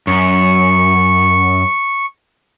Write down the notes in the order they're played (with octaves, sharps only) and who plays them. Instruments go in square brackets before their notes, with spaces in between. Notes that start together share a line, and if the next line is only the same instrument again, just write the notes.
[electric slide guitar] F#2 [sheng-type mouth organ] C#6